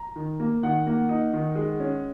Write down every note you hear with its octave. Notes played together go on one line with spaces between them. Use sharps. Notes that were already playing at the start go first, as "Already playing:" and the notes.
Already playing: A#5
D#3
A#3
D#3 F#5
A#3
D#4
D#3
G#3
C#4